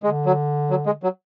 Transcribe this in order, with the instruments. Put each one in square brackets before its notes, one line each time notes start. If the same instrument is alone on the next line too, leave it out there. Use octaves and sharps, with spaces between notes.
[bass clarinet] D3 [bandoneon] G#3
[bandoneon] F#3
F#3
G#3
F#3